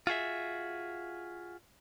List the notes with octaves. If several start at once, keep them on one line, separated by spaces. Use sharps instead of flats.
F4 F#4 G#4 E5